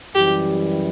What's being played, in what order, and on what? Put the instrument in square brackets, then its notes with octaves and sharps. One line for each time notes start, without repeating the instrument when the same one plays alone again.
[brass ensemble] F#2 E3 G3 [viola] G4